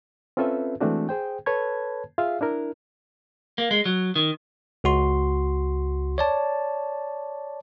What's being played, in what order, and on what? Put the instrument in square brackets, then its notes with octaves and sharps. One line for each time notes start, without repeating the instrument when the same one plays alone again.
[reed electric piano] C4 C#4 F4 A4 B4 E5
E3 G#3 A3 C4 D4 F#4
G#4 C5 G5
A4 B4 C#5 A5 B5 G#6
F4 G#4 E5 F5
D4 E4 A#4
[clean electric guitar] A#3
G#3
F#3
D#3
[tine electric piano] C#2 F#4 C6
C#5 D5 A5